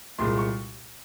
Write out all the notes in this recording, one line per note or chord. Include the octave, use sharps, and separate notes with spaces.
C2 A#2 G#3 C6
C#6